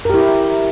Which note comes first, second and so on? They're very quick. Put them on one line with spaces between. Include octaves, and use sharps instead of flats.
A#4 G4 E4